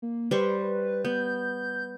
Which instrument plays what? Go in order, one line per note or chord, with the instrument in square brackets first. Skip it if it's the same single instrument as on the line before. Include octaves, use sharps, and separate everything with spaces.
[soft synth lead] A#3
[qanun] G3 C5 C#6 [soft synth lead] B4
[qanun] B3 [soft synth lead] G6